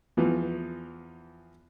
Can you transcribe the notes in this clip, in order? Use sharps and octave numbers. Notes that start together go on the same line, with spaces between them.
E2 E3 F3